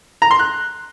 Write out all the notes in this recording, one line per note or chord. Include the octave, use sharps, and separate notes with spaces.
A#5
C6
F#6